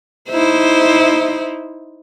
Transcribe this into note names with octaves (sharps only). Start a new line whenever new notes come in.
D#4 E4 C5